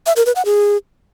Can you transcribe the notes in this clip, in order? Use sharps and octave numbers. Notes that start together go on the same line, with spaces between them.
E5
A#4
B4
F#5
G#4